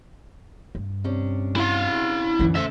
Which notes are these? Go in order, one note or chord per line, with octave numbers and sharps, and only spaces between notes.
G2
C3 C#4 D4
E4 F5
F#2 D3 E3 C#4
B2 A3 C5 E5